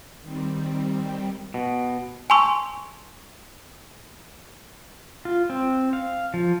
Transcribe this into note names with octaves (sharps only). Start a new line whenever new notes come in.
D#3 G3 C4
B2
G#5 A5 C6 C#6 E6
F4
C4
F5
F3